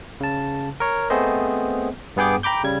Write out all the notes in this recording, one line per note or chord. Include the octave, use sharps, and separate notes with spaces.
C#3 A5
A#4 C#5
A3 B3 C4 G#4 C5 D#5
G2 B3 G#4 G5 D6
G5 A#5 B5 D6 G6
C#3 G3 G#6